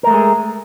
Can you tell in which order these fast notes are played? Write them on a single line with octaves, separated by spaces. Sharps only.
A#4 A3 G#3 G#4